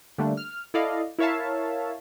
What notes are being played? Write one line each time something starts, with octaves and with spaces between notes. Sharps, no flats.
D3 G3 A3 A#3 D4
F6
E4 A4 D5 D#5 F5
E4 A#4 C#5 E5 F5 A5